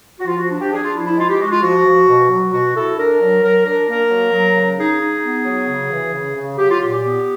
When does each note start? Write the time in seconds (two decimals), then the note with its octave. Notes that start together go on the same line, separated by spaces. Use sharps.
0.20 F#4
0.27 F3 F4
0.39 F#4
0.50 D4
0.61 G4
0.73 D4 G#4
0.83 F4
0.94 F3 E4
1.06 E4
1.17 G#3 F4
1.29 G4
1.40 G#3 F#4
1.51 F4
1.63 F3 F#4
1.86 F3
2.08 B2
2.30 F#3
2.52 B2 F#4
2.75 E4 A4
2.98 D4 A#4
3.20 F#3
3.43 F#3 A#4
3.65 D4 A#4
3.88 A#3 A#4
4.10 F#3
4.33 F#3
4.56 C#3
4.78 D#4 G#4
5.00 D#4
5.23 B3
5.45 F#3
5.69 C#3
5.91 E3
6.13 C#3
6.36 C#3
6.58 F#3 G4
6.70 F4
6.81 A#2 G4
6.92 G4
7.04 B3